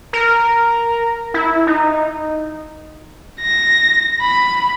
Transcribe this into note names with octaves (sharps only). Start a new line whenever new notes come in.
A#4
E4
D#4
A#6
B5